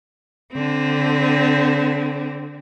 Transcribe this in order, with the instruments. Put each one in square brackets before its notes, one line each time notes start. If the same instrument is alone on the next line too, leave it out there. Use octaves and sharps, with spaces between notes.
[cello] D3 C4